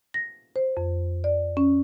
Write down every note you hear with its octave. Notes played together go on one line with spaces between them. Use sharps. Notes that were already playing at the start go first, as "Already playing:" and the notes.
A#6
C5
F2
D5
C#4